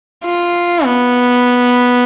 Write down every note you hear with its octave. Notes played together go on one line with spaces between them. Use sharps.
F4
B3